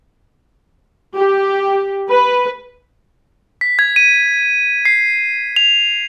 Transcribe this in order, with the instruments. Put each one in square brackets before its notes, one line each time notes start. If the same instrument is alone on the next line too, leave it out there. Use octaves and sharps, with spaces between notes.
[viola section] G4
B4
[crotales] B6
G#6
D#7
C7
F7